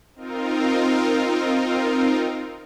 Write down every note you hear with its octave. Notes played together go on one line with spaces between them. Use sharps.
C4 D#4 F4 A#4